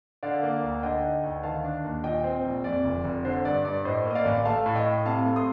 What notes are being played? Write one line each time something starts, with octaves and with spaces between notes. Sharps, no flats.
D3 D5 F5
A#3
D2
D3 D#5 G5
D#4
D2
D#3 F5 A5
D4
D#2
A#2 D#5 G5
C4
A#1
F2 D5
F1
F1
D3 C5
G2 D5
G2 D5
A2 C5 D#5
A#3
D#5
D5 F5
A1
A3 F5 A5
A2
D#5 G5
A2
C3 F5 A5
A3
C6 D#6